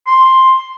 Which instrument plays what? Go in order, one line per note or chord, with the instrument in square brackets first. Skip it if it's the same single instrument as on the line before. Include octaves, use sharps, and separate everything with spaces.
[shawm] C6